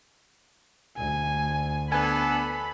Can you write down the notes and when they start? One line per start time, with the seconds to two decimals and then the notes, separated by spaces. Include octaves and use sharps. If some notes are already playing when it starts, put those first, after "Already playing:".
0.98 D2 G#5
1.92 B3 D4 A4 G#5 B5